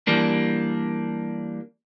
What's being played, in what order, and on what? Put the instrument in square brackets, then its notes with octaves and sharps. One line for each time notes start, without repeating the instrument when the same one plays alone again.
[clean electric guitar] E3 G3 A#3 D4